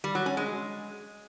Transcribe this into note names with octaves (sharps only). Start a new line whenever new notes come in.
G3
F#3
C#4
G#3